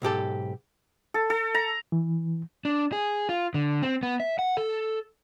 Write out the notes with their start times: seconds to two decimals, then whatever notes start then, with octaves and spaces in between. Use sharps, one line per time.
0.02 B1 G#2 G4 A4
1.14 A4
1.30 A4
1.55 A#5
1.92 E3
2.65 D4
2.92 G#4
3.29 F4
3.54 D3
3.82 C4
4.03 B3
4.20 E5
4.39 F#5
4.57 A4